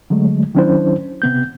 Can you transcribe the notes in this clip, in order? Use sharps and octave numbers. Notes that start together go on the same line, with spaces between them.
D3 F#3 G#3 A3
D#3 F#3 C#4 D4 E4 C5
C3 B3 G6